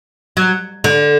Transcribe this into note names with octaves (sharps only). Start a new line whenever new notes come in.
F#3
D3